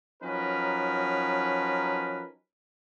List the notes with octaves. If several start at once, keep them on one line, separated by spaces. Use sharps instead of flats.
F3 F#3 C#4 D#4 A#4 B4